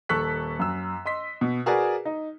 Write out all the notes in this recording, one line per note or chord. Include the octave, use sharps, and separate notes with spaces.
D#1 A4 C#6 F#6 B6
F#2 E6
D#5 C6 B6
B2
F#4 G#4 A#4 B4 D5 G#5
D#4